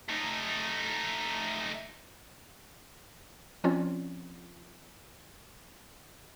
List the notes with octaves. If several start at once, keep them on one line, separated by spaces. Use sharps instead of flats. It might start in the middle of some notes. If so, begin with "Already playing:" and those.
A3 D#4
F3 C4 C#4 F4 C#5 D5